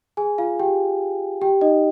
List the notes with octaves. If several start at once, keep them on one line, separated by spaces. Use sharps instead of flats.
G#4 G#5
F4 F5
G4 G5
G4 G5
D#4 D#5